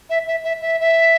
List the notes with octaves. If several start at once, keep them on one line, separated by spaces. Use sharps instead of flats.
E5
E5
E5
E5
E5